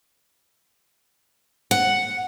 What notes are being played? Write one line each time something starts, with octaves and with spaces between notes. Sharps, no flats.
F#5